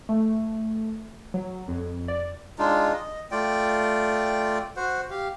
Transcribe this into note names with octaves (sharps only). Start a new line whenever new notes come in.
A3
F#3
F2
D5
G#3 D4 D#4 F4
D#5
A3 F4 D5 G5
F#4 C5 F#5
G4 F5